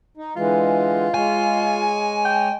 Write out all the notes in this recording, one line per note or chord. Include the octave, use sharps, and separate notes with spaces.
D#4
D3 E3 G#3 F4
G#3 C#5 G#5
G5